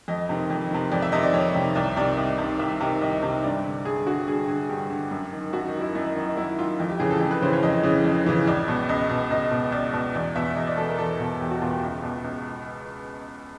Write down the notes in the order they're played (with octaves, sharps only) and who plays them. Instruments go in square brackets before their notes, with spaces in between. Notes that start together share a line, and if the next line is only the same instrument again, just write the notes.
[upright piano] F2 D#5
C3 D#3
F2
C3 D#3
F2 D5
E5
C3 D#3 D#5
D5
F2 C#5
C3 D#3
C2 D5
C3 D#3 D5
C2 D#5
C3 D#3
C2 E5
C3 D#3
C2 D#5
C3 D#3
G2 D5
D3
G2 G#4
D3 F#4
G2 G#4
D3 G#4
G2 G4
D3
F#2
D#3
F#2 F#4
D#4
D#3
E4
F#2 D#4
D#3 D#4
F#2 E4
D#3 F4
F2
G4
C#3 E3 G#4
A4
F2 A4
B4
C#3 E3 C5
C#5
F2 D#5
C#3 E3
F2
C#3 E3
C#2 D5
B2
C#2 D#5
B2
C#2 D#5
B2
C#2 D5
B2
E2 D5
B2 E5
E2 D#5
D5
B2 A4
A#4
E2 A4
B2
E2 G4
F#4
B2 F4
G4
C#2
B2
C#2